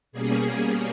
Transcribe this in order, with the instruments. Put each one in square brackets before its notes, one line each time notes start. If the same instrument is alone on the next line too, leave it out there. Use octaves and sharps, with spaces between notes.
[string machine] B2 G3 A#3 C#4 G#4